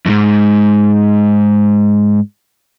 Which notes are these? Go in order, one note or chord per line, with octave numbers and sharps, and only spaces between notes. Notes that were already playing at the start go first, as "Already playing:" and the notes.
F2 G#2